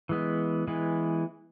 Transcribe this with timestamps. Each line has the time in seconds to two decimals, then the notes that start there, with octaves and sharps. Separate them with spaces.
0.09 E3 G#3 B3
0.67 E3 G#3 B3